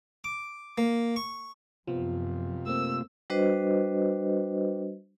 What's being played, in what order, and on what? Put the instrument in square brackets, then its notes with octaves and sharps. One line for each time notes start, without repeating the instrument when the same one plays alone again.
[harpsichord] D6
A#3
C#6
[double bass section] F#2 [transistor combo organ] C3 F4 [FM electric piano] F3 B3
[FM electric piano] A3 A#3 C4 [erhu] E6
[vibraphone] G3 D4 F#4 B4 C5 D#5